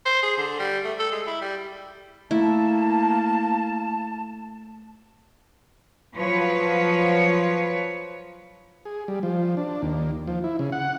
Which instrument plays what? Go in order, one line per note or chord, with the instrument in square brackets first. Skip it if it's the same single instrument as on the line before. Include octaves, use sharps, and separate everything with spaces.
[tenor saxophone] C5
G#4
D3
G3
A3
A4
G#3
E4
G3
[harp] A3 A4 [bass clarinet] A#3 [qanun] E4 [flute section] A5
[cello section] F3 F#3 B4 C#5
[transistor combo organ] G#4
G3
F3
D4
D#2
F3
E4
C#3
F#5